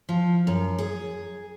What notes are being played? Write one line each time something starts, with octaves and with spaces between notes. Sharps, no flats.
F3
F#2
G#4